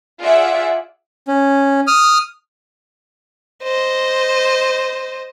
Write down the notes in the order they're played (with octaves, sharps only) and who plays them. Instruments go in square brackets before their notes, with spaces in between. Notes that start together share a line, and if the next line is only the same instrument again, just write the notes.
[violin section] F4 G#4 D5 E5 F#5
[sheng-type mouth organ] C#4
D#6 F6
[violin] C5 D#5